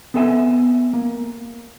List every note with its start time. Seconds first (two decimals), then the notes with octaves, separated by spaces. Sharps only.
0.14 B3 C4 A4 E5 G#5
0.93 A#3